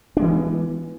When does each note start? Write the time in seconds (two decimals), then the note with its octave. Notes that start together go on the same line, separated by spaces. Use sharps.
0.17 D4
0.19 G#3
0.22 E3
0.25 B3